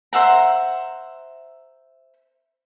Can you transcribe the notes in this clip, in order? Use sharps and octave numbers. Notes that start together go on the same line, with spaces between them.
C5 E5 F#5 A#5